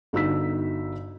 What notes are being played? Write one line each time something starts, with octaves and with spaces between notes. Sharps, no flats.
G1 D#4 F#4 E6 B6